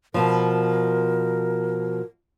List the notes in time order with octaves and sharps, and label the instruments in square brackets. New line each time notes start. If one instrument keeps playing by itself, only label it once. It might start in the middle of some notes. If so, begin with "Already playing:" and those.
[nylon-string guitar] B2 F3 [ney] A#4